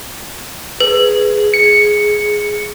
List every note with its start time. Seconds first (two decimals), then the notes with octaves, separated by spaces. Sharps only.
0.80 G#4 B4
1.54 C#7